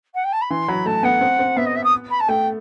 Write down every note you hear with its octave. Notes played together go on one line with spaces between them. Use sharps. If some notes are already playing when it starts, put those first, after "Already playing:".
F#5
G5
A5
B5
E3 C6
F#3 B5
A3 A5
B3 F#5
C4
C4
B3 E5
D#5
E5
D#6
B5
A5
A3 G5